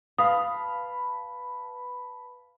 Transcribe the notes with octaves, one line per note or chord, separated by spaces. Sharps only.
B4 F5 A5 B5 D#6